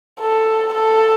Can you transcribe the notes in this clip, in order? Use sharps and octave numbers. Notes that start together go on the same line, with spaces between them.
A4
A4